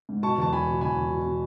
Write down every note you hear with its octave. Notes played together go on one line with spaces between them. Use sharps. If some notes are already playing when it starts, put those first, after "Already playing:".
G#2
B2 A5 C#6
E2 A5
E2 G#5 B5
B2
E2 G#5 B5
E2
B2
B2